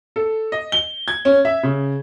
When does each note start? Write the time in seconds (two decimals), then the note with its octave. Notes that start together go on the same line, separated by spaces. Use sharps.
0.16 A4
0.52 D#5
0.72 G7
1.08 G#6
1.25 C#4
1.45 E5
1.63 C#3